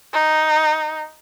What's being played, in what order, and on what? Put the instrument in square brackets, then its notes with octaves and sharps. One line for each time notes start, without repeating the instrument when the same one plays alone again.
[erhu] D#4